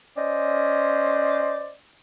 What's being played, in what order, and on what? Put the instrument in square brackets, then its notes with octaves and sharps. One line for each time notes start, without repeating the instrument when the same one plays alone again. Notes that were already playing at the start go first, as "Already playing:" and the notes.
[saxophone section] C#4 C5 D5 D#5